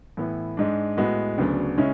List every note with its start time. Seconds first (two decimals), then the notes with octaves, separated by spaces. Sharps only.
0.17 A2 E3 B3 E4
0.57 G#2 G#3 D4
0.97 A2 G#3 B3 F#4
1.38 D2 C#3 F#3 B3 D4
1.78 C#3 G#3 C#4 E4